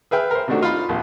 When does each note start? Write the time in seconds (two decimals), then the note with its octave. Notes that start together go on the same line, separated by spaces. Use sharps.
0.11 G#4 B4 E5 G5 F6
0.31 A#4 C5
0.48 C3 D#3 A3 D4 F#4
0.61 D#4 F4 F5 B5
0.89 A#1 D#2